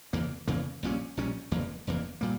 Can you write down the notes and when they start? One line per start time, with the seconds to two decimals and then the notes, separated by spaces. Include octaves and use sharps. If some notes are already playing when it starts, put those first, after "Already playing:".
0.13 E2 C#3 E3 A#3
0.48 E2 C#3 E3 A#3
0.83 A#1 A#2 G3 C#4
1.17 A#1 A#2 G3 C#4
1.51 F1 E2 E3 A#3
1.87 F1 E2 E3 A#3
2.21 A#2 G3 A#3